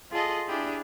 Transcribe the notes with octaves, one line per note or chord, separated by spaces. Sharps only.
F4 G#4 A4 D#5
D4 E4 G4 G#4